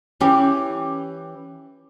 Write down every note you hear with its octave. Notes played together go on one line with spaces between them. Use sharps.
E3 C#4 G4